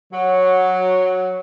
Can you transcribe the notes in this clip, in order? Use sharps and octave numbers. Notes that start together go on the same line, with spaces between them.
F#3